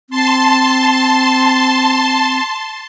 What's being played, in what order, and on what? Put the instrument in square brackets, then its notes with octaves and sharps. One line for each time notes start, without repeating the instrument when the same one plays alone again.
[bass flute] C4 [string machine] A5 C6